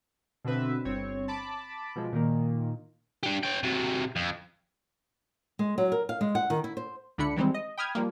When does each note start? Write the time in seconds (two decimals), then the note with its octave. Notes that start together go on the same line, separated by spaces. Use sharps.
0.45 B2 D3 C4 B4 E5
0.85 G1 C4 C#5
1.28 A5 B5 D6
1.96 B2 F3 G#3
2.12 A#2 D#3 A#3
3.23 D4 G4
3.43 C#4 G5
3.63 C3 F#3
4.16 F2
5.59 G#3
5.78 F#3
5.92 A#4
6.09 F5
6.21 G#3
6.35 F#5
6.50 D#3
6.64 E4
6.77 C5
7.18 C#2 D3 A3 D4 B5 C#7
7.36 D#3 E3 G3 G#3 C4
7.54 D#5
7.78 G5 B5 D#6 F6 G#6
7.95 F3 G3 A#3